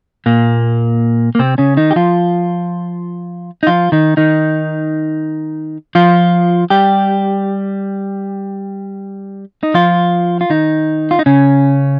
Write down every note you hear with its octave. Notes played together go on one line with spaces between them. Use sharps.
A#2 A#3
A#3
C3 C4
C#3 C#4
D#3 D#4
G4
F3 F4
D#4
F3 F4
D#3 D#4
D#3 D#4
F3 F4
G3 G4
D#4
F3 F4
F4
D#3 D#4
F4
D#4
C#3 C#4